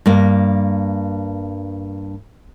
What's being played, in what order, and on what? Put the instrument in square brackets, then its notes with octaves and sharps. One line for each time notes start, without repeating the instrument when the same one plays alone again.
[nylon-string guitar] G2 A#3